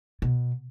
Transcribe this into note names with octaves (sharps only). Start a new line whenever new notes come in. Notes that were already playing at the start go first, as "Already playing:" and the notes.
B2